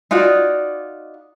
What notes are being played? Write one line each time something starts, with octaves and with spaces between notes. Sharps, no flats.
D#4 F4 F#4 D5